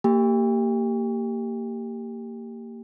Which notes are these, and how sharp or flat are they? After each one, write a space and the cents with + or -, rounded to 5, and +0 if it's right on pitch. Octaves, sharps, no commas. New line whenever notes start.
A#3 -25 G4 +0 G5 +45